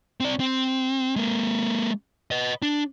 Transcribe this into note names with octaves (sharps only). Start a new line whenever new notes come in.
C4 D5
C4
G#3 A#3
B4 D#5
D4